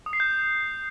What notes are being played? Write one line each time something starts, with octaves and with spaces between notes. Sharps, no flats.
D#6
C7
G6